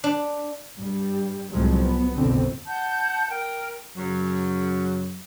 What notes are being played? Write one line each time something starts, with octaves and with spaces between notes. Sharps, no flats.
D4
G2 G3
C2 F2 A2 F3 F#3 G#3
B3
F#1 B1 F2 B2 D3 C4
F#5 A5 G6
A#4 G5
F#2 C#3 F#3